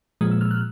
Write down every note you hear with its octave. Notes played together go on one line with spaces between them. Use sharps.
A#2 F3 G#3 D#6
E6
F6
F#6